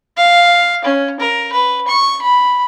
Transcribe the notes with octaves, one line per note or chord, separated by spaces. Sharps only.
F5
C#4
A#4
B4
C#6
B5